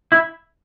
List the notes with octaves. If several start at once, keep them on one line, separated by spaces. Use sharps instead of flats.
E4